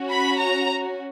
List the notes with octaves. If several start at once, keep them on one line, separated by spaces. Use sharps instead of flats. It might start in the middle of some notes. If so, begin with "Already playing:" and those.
Already playing: C#4 F#4
B5
A#5